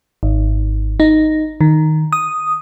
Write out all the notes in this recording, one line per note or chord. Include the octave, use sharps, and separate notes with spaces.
G#1
D#4
D#3
D#6